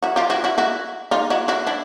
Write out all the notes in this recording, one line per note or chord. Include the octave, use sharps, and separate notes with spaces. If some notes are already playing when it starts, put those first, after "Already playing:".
E4 F#4
F4 G4
E4 F#4
E4 F#4
E4 F#4
D#4 F4
E4 F#4
E4 F#4
D4 E4